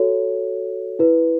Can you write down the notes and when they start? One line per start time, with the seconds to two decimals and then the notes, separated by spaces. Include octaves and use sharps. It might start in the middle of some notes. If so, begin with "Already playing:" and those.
Already playing: F#4 A4 C#5
0.99 E4 B4